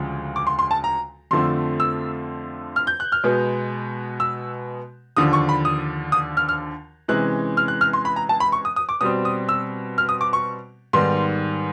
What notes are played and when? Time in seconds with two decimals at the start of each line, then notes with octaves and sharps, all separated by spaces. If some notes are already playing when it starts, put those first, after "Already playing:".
Already playing: D2 C#3 F3 G#3
0.36 D6
0.47 C6
0.59 C6
0.71 A5
0.84 A#5
1.31 F2 D3 F3 A3 C4 C6
1.80 E6
2.76 F6
2.87 G6
3.00 F#6
3.12 F6
3.24 B2 G#3 B3
4.20 E6
5.17 D#2 D3 F3 D#6
5.33 C#6
5.49 B5
5.65 D#6
6.12 D#6
6.37 F6
6.49 F6
7.08 C3 E3 G#3 C#4 F#6
7.57 F6
7.68 F#6
7.81 F6
7.93 C6
8.05 B5
8.16 A#5
8.29 A5
8.40 B5
8.52 C#6
8.65 D#6
8.76 D#6
8.89 D6
9.01 B2 G3 C4 D#6
9.25 D#6
9.49 E6
9.98 F6
10.09 D#6
10.21 D6
10.33 C#6
10.93 G#2 D#3 G3 B3 C6